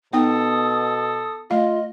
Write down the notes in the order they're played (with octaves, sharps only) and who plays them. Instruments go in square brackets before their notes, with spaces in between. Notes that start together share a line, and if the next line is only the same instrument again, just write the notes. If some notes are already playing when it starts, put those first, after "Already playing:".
[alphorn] B2 [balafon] B3 D#4 G5 [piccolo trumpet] A4 [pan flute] D#6
[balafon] A3 F5 [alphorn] F4 [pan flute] D#5